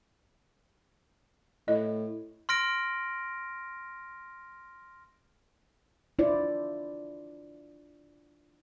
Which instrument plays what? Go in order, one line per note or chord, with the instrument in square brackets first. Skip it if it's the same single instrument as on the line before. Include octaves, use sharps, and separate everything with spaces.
[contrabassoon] A2 [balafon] D#5
[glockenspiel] C6 F6 A#6 D7
[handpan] D4 E4 F4 C5 D5